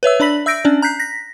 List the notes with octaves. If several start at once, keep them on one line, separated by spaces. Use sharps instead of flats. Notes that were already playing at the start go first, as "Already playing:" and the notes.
B4 C#5 E5 E6
D4 D5 B5 B6 F#7
E5 E6 G6 A#6 D7
C#4 D4 D5
A#5 F#6 G6 B6 C7
A#6 B6